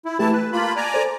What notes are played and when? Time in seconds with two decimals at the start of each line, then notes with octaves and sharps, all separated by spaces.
0.05 E4
0.19 E3 A3 E4 G4 A5
0.33 B4 A5 F#6
0.53 A#3 F4 B5
0.76 D5 G#5 A#5
0.94 A4 C5